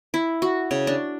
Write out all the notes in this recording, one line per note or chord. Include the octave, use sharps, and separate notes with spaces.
E4
F#4
C#3
D4